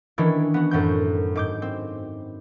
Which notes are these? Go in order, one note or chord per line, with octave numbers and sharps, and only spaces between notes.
D#3 E3 C#4 D4 E4
B3 F#4
F#2 A2 C4 G6
G#2 D6 G6
C4